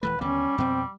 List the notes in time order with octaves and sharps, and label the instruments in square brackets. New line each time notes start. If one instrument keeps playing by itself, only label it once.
[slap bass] D#1 E3 A3 [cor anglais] B4
[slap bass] D#2 D3 B3 [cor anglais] G3 [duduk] C#4
[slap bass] F2 B2 [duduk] C4